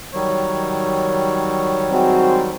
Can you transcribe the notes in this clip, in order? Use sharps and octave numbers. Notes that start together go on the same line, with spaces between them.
D#3 F#3 G3 C#5
G#3 C4 F#4